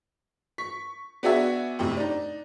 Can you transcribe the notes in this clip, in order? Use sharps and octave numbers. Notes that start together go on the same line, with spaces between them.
C#6 B6
B3 D4 F#4 G#4 E5
F2 A2 C3
D4 D#4